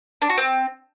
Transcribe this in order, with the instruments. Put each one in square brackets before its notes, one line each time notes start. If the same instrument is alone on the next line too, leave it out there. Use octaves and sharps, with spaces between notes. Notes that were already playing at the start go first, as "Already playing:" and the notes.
[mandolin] D4
F#4
C4